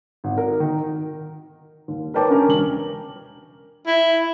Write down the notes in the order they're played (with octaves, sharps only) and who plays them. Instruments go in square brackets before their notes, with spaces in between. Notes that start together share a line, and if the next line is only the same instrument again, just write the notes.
[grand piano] G#1
A#4
D#3
[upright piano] D#2
A#4 B4 C#5 G5 A5 D6
C#4 D4 A#4
E1 F#7
[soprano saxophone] E4